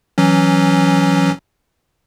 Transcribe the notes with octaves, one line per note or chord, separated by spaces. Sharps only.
E3 F#3 C#4